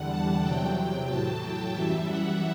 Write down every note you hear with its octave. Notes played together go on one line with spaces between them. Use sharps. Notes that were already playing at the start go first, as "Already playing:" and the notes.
Already playing: E2 D3 G3 F#5
A5
E2 C3 F#3 G5
G5
A2 F#3 A5
G5
F#2 E3 G3 E5
F#5